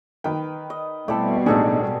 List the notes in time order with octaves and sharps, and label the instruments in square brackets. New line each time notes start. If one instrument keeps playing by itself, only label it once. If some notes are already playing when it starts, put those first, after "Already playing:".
[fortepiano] D#3 G5 [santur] B4
[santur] D#5
[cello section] B2 G3 [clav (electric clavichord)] A3 E4 A4 [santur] C4 D5
[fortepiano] A1 A2 [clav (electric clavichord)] D4 D#4 [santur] G#4 A4 D5